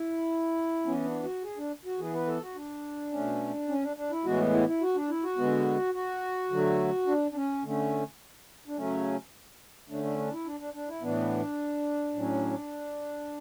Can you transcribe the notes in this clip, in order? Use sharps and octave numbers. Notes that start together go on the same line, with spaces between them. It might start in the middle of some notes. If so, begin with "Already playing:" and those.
Already playing: E4
E3 B3 C#4
D4
F#4
G#4
D4
F#4
E3 B3 G#4
B4
A4
F#4
D4
B2 A3 C#4
C#4
D4
D4
E4
A2 E3 G#3 B3 F#4
E4
E4
F#4
D4
E4
F#4
D3 G#3 B3
F#4
D3 F#3 A3
D4
D4
C#4
D3 A3 C#4
D4
C#3 F#3 A3 C#4
D3 A3 C#4 D4
D4
D4
E4
D4
D4
D4
E4
A2 E3 B3 D4
A2 F#3 C#4